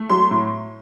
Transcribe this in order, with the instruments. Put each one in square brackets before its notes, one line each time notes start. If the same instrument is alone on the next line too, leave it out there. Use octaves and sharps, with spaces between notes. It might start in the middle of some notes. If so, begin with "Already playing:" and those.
Already playing: [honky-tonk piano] A3
F#3 C6
A2